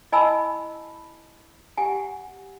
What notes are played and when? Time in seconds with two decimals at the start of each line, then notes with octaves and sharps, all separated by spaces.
0.12 E4 D#5 G#5 A5 B5 E6
1.77 G4 F#5 G#5